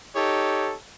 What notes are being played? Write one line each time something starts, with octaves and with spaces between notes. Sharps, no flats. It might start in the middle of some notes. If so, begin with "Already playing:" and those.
D#4 G4 A4 C#5